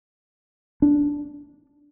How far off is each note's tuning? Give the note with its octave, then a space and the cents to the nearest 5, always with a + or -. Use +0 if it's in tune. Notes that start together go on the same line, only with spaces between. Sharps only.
D4 -10